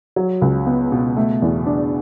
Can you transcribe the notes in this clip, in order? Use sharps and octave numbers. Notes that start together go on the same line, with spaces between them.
F#3
C#2
B3
B2
A3
E2
D4